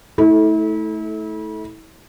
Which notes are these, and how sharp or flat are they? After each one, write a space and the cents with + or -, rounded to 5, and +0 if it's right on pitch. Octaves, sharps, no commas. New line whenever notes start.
A3 -5 E4 -35 A4 -20